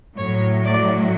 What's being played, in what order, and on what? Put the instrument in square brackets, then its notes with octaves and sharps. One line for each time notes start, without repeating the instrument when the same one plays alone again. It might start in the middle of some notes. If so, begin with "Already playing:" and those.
[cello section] A2 F#3 C#5
D5